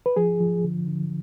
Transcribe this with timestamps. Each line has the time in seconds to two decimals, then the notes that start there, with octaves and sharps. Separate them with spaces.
0.06 B4
0.16 F3 G#4
0.40 F3
0.64 D3
0.87 D3